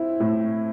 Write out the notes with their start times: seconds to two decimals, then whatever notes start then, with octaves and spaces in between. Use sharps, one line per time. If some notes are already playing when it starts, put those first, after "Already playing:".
Already playing: C4 E4
0.20 A2